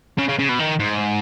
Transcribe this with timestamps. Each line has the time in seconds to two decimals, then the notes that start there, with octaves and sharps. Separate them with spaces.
0.18 C#3
0.29 C#3
0.39 C#3
0.49 B2
0.59 D#3
0.80 G#2